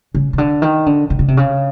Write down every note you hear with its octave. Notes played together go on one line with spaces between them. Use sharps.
C#3
C#3
D3
D#3
D3
D3
C#3
C3
C#3